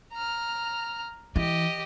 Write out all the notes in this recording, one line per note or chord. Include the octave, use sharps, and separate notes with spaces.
A#5 F6
E3 G4 D#5